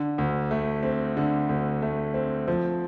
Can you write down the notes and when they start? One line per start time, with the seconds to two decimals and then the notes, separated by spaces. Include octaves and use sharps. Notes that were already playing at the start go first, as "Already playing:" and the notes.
Already playing: D3
0.18 D2
0.51 A3
0.83 C4
1.17 D3
1.49 D2
1.82 A3
2.14 C4
2.48 F3